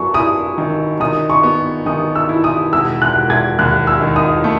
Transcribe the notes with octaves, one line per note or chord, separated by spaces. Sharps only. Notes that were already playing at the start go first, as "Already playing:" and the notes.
Already playing: F#3 B3 C#6
E4 D#6
D#3
D#3 D#6
C#6
B3
D#3 D#6
E6
E4
D#6
E1 E6
F#6
E1
G#6
D#2 F#6
E6
D#3
D#6
A3